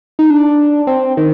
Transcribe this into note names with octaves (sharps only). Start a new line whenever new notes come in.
D#4
D4
C4
D#3